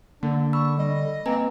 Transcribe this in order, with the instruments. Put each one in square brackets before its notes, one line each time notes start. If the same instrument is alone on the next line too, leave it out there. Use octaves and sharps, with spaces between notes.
[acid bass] D3 [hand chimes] A#3 [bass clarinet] D4
[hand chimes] B5 E6 [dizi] C#6
[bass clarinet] G3 [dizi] D#5
[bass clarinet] A#3 [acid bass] C4 [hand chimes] B4 G#5 A#5